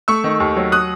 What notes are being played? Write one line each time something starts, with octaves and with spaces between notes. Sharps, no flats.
A3 C#6 E6
D#3
D#2
F#3
D#6 F#6